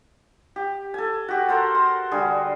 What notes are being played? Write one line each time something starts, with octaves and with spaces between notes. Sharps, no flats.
G4
A4 G#5
F#4 G4
A4 A#4 C5 F#5
C6
D3 G3 F#4 G#4